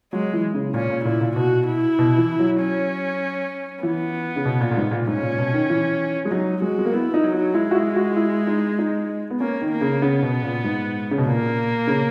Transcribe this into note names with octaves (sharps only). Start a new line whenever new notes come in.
F#3 G#3
E3
C#3
A#2 C#4
A#2
A#2 E4
A#2
B2 F#4
E4
B2
E3
F#3
C#4
E3 B3
C#3
B2
A#2
A#2
G#2
A#2
G#2 C#4
A#2
B2
D#3
E3
G#3
F#3 D#4
G#3 F#4
G#3
A#3
B3 E4
D#4
F#3
D#4
G#3 E4
F#4
E4
F#4
E4
D#4
D#4
B3
A#3 C#4
D#3
A#3
C#3
C#3 B3
B2
A#2
G#2
C#3
B2
A#2 A#3
C#3